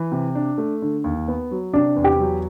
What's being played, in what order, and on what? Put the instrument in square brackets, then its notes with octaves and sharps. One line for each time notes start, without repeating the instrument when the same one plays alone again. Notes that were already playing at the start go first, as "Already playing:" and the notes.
Already playing: [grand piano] E3
C3
D4
A3
D3
D#2
B3
F#3
[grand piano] C3 [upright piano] D4
[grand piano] E2
[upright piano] G4
[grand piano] F#3